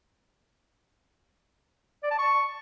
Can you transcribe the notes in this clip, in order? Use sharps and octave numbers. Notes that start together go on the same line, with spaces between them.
D5
A5
C#6